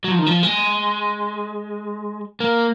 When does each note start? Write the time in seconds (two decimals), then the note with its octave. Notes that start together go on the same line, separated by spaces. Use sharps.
0.04 F#3
0.11 F3
0.19 D#3
0.26 F3
0.43 G#3
2.40 A#3